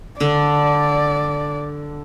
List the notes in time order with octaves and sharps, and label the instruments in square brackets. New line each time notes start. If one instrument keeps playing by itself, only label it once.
[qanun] D3 [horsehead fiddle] D5